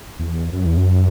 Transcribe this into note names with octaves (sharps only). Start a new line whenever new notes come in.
E2
F#2
E2
F#2